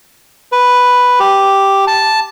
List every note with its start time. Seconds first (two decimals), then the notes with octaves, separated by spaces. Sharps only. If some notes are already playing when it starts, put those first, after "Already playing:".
0.52 B4
1.20 G4
1.87 A5